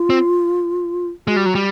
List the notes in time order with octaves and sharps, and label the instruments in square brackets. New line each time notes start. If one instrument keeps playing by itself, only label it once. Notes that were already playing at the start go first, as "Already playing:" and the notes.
Already playing: [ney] F4
[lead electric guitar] C4
[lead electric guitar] G#3 [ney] F#4
[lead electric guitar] G3
F#3
G3